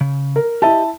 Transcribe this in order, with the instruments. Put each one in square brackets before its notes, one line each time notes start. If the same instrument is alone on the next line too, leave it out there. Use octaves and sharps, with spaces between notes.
[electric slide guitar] C#3
[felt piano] A#4
[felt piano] E4 E5 A5 [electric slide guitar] G4 D#5